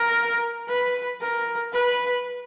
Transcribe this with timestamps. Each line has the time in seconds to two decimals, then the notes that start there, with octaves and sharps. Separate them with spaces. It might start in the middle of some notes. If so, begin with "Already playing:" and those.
Already playing: A#4
0.68 B4
1.21 A#4
1.73 B4